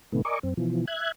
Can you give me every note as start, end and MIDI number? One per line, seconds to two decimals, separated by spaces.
0.12 0.22 45
0.12 0.22 48
0.12 0.22 51
0.12 0.22 57
0.12 0.22 59
0.25 0.39 70
0.25 0.39 74
0.25 0.39 75
0.25 0.39 80
0.25 0.39 85
0.25 0.39 86
0.43 0.54 42
0.43 0.54 60
0.57 0.85 47
0.57 0.85 52
0.57 0.85 53
0.87 1.12 76
0.87 1.12 90
0.87 1.12 92